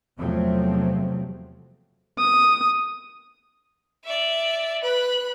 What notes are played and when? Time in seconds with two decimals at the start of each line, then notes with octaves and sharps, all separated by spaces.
0.19 E2 C3 F3 F#3 A3 C4
2.18 D#6
4.04 D5 E5
4.83 B4 B5 F#6